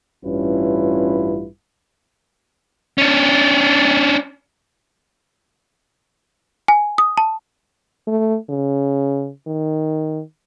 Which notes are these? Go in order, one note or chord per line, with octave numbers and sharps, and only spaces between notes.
A1 G2 C#4 E4 F4 B4
C#4 D4
G#5
D#6
A5
A3
C#3
D#3